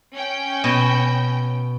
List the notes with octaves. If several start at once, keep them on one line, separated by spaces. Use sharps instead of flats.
C#4 G5
B2